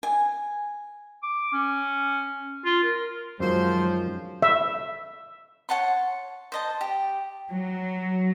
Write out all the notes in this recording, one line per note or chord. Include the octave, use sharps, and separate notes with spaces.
G#5
D6
C#4
F4
A#4
F#2 D#3 F3 F#3 G#3 C5
E5
C#5 F#5 A5 C6
C5 D#5 A5
G4
F#3